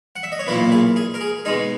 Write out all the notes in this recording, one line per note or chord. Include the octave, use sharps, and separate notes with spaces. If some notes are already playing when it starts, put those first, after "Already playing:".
F#5
E5
D#5
C#5
B1 A#2 A#3 E4 B4
G#4
G#4
A#4
G#4
B2 G#3 D#4 G#4